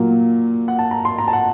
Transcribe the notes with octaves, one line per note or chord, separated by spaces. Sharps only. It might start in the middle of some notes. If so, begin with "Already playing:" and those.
Already playing: A#2 F#3 A#3
F#5
A5
A#5
C6
A#5
A5
F#5